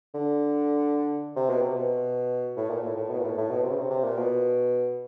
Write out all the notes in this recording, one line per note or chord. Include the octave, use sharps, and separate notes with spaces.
D3
C3
B2
C3
B2
A2
A#2
A2
A2
B2
A#2
A2
A2
B2
C3
C#3
C3
C3
A#2
B2